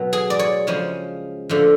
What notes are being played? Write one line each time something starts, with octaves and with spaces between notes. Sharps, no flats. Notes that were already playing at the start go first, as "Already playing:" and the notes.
Already playing: B2 F#3 B3
G#4
D5
C#5
C#3 F3 G#3 C#4
D3 F3 A3